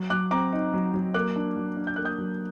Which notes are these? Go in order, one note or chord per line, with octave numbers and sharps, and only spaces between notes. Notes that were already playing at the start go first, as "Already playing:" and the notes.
Already playing: F#3
F#3 D6 F#6
C4 A#5 D6
D#4
F#3
F#3
A#3 D6 F#6
D4
F#3
D4
G6
A#3 F#6
D#6 G6
F#3